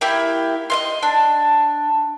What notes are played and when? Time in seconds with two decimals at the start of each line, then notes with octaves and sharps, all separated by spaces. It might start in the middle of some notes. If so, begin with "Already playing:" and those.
0.01 A#3 E4 G4
0.70 D#5 F5 C6
1.03 D4